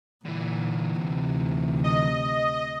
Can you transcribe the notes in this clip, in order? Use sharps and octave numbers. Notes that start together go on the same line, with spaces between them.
A#2 D3 E3
D2 C3
D#5